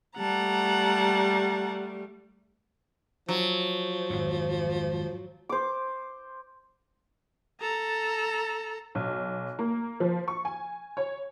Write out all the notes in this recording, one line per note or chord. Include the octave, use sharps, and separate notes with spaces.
G3 A3 F#5 A5 A#5
F3 F#3
G#1 F2
C5 D6
A4 A#5
B1
A#3
F3
C#6
G#5
C#5